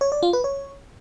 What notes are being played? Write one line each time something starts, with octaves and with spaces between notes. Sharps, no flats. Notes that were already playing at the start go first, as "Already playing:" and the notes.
C#5
D5
F4
B4
C#5